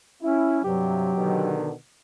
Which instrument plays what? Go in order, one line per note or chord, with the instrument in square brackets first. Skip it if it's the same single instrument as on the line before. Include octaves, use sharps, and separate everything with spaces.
[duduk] C#4 [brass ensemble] E4
[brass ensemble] G2 C3 [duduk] F#3 [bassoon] G4
[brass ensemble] B2 D3 D#3